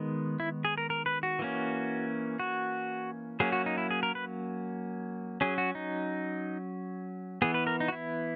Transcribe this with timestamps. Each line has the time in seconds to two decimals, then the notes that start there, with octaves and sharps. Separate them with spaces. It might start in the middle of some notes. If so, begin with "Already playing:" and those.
Already playing: D#3 G#3 B3
0.40 E4
0.65 G#4
0.78 A#4
0.90 A#4
1.06 B4
1.23 F#4
1.39 E3 A#3 C#4
2.39 F#4
3.40 F#3 A#3 C#4 G#4
3.52 F#4
3.66 D#4
3.78 E4
3.91 G#4
4.03 A#4
4.15 B4
5.41 F#3 C#4 G#4
5.58 F#4
5.75 D#4
7.42 E3 B3 G#4
7.54 B4
7.67 A#4
7.80 D#4
7.88 F#4
7.92 E4